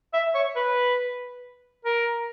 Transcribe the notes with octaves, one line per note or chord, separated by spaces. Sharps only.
E5
C#5
B4
A#4